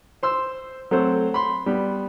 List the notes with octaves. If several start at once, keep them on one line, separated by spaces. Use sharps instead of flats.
C5 C6 E6
F#3 A3 C4 A4 C5
B5 C6
G3 B3